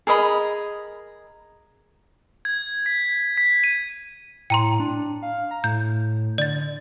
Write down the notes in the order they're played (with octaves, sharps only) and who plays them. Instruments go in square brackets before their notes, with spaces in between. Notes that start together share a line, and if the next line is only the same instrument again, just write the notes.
[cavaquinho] G#4 A#4 D#5 B5
[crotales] G#6
B6
B6
D#7
[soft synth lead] A2 [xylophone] G5 A#5 C6
[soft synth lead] D4
F5
A#5
[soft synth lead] A2 [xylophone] G6
[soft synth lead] D3 [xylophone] D5 A6